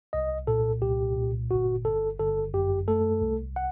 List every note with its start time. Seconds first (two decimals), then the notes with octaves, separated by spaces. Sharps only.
0.13 C2 D#5
0.47 A#2 A4
0.82 C2 G4
1.16 A#2
1.50 G1 F#4
1.85 G1 A4
2.19 G1 A4
2.54 F#2 G4
2.88 A3 A4
3.22 C2
3.56 F#5